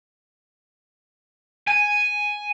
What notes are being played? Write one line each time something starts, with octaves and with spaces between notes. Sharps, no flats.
G#5